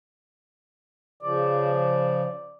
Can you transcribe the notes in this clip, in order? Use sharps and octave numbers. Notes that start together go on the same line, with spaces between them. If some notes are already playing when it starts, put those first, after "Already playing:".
C#3 F3 D5